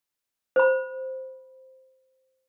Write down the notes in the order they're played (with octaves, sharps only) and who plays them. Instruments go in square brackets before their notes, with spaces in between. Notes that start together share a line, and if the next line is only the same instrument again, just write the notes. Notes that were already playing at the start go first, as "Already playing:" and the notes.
[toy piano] C5 B5